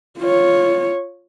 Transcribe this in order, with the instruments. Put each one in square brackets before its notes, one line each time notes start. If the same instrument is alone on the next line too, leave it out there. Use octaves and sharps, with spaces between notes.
[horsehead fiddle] F4 C#5